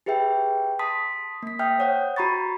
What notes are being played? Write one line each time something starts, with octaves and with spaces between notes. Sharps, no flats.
G4 G#4 B4 E5 G5
A5 C6 D#6 B6
A#3 B6
E5 G5 D#6 F6 G6
C5 C#5 F#5
F#4 A#5 B5 C#6 A6